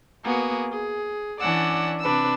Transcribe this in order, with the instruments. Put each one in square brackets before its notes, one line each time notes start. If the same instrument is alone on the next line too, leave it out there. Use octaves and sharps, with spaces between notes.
[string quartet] A#3 B3 F#4 G#4
G#4
E3 C#4 D4 D5 F#5 E6
C3 D4 B4 E6